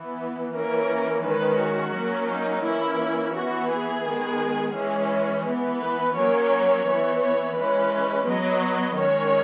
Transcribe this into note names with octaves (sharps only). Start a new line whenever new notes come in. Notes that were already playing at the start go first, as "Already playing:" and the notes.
Already playing: E3 B3
E3 A#3 C#4 A#4
D#3 G#3 C#4 B4
F#4
F#3 A#3 C#4
D#4
E3 A#3 C#4 E4
E3 B3 F#4
G#4
D#3 G#3 B3
E3 G#3 C#4
E3 B3
B4
F#3 A#3 C#4 C#5
E3 B3
C#5
E3 G#3 C#4 B4
F#3 B3 D#5
D#3 G#3 C#4 C#5